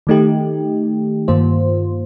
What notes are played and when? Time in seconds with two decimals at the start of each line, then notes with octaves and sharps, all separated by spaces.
0.07 D#3 A3 D#4 G4
1.28 G2 D#3 A#3 F4 C5